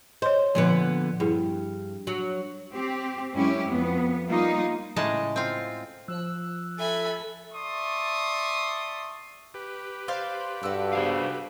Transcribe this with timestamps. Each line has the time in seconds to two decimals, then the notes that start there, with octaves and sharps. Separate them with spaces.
0.22 C5 C#5 D#5
0.55 A#2 D3 F3 B3
1.20 G2 E4 G#4
2.07 F#3
2.74 C4 G4
3.34 F#2 G#3 C#4 E4 G4
3.69 F2 B3
4.29 G3 A#3 D#4 F4
4.96 A2 C#3 G#3 D#5 A5
5.36 C4 F4
6.08 F3 E6 F#6
6.79 A4 E5 G#5 B5
7.52 D5 E5 A5 C6 C#6 D#6
9.54 G4 B4
10.08 C5 D5 F5
10.63 G2 F#4 A4
10.93 G#4 C5 F5